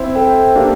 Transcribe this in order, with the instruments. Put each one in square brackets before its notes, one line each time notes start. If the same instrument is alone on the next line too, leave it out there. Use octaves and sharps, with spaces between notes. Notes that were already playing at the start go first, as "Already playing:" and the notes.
Already playing: [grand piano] C4 E4
[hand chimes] A4 C5 G5
[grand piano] A#3 D4 [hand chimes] G4